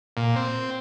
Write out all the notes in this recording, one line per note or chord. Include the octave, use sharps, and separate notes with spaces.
A#2
C4